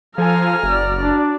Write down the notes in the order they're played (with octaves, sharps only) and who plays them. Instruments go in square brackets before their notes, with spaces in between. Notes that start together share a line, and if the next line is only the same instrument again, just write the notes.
[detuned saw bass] F3 [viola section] A4 F5 G#5 [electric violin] A#5 F6
[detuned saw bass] F#1 [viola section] F#4 D5
[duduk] D4